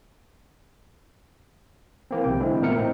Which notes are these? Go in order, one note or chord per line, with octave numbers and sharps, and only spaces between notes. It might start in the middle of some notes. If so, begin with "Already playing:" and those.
E3 A#3 C4
B1 C3 G5
D3 E3 G#3 C4 E4
A#2 A3 B3 A#4 C#7
A2 C4 D#4